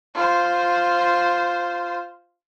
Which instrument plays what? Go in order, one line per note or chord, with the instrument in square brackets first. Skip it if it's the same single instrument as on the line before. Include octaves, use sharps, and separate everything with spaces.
[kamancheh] F4 C5